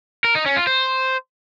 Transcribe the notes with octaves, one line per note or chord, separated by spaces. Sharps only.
A#4
D#4
C#4
F4
C5